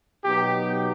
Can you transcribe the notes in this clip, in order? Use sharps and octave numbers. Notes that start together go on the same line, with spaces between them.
B2 F#3 B3 D#4 G4